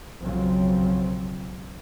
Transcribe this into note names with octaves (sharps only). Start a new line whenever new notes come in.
B1 F#2 C#3 F3 F#3 C4